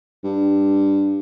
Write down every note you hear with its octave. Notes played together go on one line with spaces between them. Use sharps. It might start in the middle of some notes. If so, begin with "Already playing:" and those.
G2